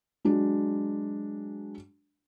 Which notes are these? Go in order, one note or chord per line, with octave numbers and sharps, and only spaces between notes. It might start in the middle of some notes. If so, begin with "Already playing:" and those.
F#3 G#3 D4